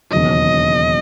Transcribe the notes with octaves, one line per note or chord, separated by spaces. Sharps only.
E1 D#2 C#3 F#3 D#5